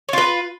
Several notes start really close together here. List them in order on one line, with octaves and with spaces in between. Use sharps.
C#5 F4 B4